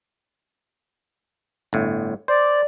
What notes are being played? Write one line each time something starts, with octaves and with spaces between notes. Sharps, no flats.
G1 A2
C5 D5